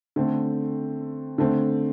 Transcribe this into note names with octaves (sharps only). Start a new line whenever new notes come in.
D3 A3 C4
D3 A3 C4